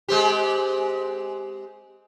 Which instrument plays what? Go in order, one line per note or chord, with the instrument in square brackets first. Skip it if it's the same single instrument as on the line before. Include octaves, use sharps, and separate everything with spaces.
[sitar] G#3 C4 G4